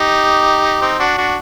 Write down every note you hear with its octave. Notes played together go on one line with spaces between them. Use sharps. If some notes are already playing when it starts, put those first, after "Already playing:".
Already playing: D#4 G4
C4 D#4
D4 F#4
D4 F#4